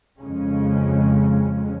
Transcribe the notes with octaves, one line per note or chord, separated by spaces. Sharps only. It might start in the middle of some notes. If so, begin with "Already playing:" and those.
F2 C#3 G#3 C#4